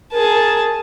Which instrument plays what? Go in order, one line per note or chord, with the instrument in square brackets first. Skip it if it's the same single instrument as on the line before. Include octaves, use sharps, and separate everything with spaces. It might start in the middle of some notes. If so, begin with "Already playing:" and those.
[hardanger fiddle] G#4 A5 [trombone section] A#4